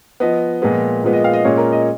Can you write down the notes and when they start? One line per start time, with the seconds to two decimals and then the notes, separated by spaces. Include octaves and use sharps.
0.20 F3 B3 D#5
0.62 A#2 F3 G#3 B3
1.04 A#2 F3 G#3 B3
1.13 D#5
1.24 F5
1.33 D#5
1.44 A#2 G#3 C#4 C#5
1.57 A#4
1.72 D#5